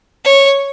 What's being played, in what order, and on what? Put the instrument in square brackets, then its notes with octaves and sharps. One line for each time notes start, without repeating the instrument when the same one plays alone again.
[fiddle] C#5